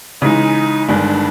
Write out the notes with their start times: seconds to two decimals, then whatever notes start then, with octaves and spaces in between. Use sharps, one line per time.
0.22 C#3 E3 G#3 D#4
0.88 G1 G2 D#3 G#3 D4